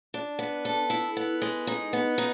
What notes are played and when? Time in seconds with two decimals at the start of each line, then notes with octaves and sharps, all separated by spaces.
0.14 D4
0.39 B3
0.65 A4
0.90 E4
1.17 B3
1.42 G#3
1.67 D#4
1.93 B3
2.18 D#4